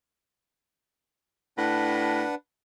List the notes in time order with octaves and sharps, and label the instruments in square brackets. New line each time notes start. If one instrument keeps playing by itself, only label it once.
[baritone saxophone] A2 [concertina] D4 B4 F#5